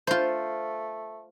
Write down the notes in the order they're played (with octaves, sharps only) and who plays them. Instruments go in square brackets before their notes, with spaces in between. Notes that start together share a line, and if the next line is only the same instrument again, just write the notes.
[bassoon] A3 [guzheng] F4 C5